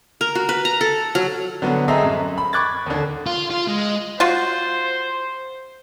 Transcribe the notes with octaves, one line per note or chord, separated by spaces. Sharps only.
A#4
F#4
B4
A#5
A4
F#3
D3 F#3 B3
C4 G#4 A4 D#5 E5 A#5
F#2
B5
B5 C#6 D6 F#6 G#6 A6
D#2 D3
F4
F4
G#3
F4 F#4 C5